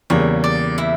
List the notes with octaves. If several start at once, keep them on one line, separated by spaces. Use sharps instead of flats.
E2 C#3 G3 A#3 C#5
D5
E4 E5